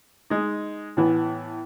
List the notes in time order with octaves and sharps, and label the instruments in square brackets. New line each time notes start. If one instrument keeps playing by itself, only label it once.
[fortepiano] G#3 D#4
A2 E3 B3